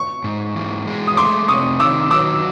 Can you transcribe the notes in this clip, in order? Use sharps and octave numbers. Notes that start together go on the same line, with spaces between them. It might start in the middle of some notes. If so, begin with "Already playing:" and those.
Already playing: C#6
G#2
E3
G#3
D#6
A3 C6 D6
C3 C#6 D#6
D#3 D6 E6
F#3 D6 E6